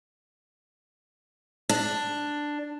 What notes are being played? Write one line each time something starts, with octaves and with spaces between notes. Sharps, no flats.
D4